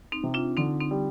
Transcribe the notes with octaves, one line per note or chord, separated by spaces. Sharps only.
C4 D#4
C3
D4 F4
D3 C4 D#4
C4 D#4
G3